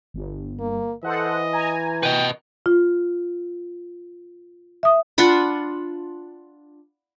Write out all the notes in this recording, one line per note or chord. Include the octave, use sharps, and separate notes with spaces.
G1
A#3
E3 A4 C5 D#5 F#5
G#5 A#5
B4 D#5 G5
F4
E5 D#6
D4 F4 F#5 B5